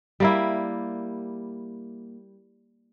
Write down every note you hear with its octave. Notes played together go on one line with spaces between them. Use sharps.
G3 A#3 E4